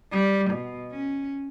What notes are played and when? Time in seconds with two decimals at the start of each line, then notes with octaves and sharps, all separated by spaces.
0.12 G3
0.51 B2
0.92 C#4